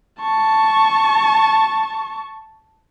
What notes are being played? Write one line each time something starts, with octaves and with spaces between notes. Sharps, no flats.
A5 C#6